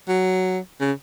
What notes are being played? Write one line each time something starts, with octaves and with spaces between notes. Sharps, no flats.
F#3
C#3